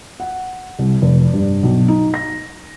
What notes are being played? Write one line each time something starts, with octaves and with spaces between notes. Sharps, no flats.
F#5
C2
F1
G2
B1
D#4
A#6